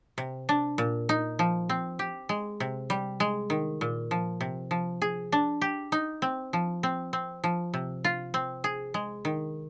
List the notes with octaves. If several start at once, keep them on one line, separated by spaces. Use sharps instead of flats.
C3
D4
A#2
D#4
F3
C4
G4
G#3
C3
G3
G#3
D#3
A#2
F3
C3
F3
G#4
D4
G4
D#4
C4
F3
C4
C4
F3
C3
F4
C4
G#4
G#3
D#3